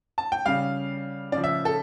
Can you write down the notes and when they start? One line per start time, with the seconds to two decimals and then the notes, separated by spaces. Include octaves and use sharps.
0.18 A5
0.32 G5
0.46 C#3 G3 F5
1.32 C#3 D5
1.37 F3
1.44 E5
1.65 A4